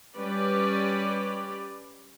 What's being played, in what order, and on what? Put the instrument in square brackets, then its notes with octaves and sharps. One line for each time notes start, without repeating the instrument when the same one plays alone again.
[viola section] G3 C#4 G4 B4 D5